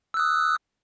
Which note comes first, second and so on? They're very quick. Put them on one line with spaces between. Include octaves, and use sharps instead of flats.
E6 F#6 D#6